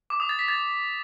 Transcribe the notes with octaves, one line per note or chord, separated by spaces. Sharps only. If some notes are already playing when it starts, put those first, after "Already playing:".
D6
D#6
A6
B6
A6